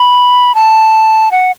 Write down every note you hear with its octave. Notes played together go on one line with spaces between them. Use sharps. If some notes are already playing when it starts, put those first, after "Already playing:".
Already playing: B5
A5
F#5